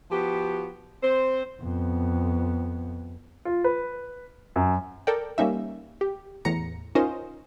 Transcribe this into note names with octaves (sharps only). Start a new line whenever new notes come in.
F3 B3 F#4 G4
C4 C5
F2 B3
F4
B4
F#2
A4 A#4 D5 G5
G3 A#3 C#4 D#4 E5
G4
E2 A2 A#5 C#7
C#4 D#4 F4 A#4 C5 D#5